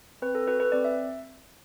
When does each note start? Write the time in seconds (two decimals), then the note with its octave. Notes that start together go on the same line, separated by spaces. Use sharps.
0.22 C4 B4
0.35 A4
0.47 F#4 A4 B4
0.60 B4
0.72 C4 D5
0.84 E5